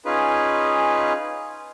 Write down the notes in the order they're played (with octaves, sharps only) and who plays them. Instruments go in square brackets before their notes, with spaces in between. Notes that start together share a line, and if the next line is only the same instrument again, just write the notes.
[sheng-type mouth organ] C#4 D#4 F4 G#4 B4